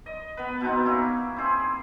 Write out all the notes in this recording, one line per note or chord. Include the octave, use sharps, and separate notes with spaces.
D#5
B3 B4
B2 B3 C4 D#4
A#3 C#4 E4
C4 E4 G#4 C5